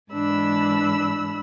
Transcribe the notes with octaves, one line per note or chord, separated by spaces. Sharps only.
G#2 E3 D4 B5 E6